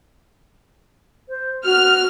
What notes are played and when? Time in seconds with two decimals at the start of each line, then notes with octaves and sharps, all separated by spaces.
1.29 C5
1.65 F#4 F6